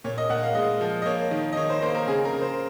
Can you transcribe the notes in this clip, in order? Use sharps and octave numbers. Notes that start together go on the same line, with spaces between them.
A#2 C#5
D#5
A#2 F#5
F5
G#3 D#5
F3
D#5
A#3 C#5
D#3
D#5
D#3 C#5
C5
A#3 C5
A#4
C#3 G#4
A#4
C#3
C5